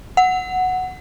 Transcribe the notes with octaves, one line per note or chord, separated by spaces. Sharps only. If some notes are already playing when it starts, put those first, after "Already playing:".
F#5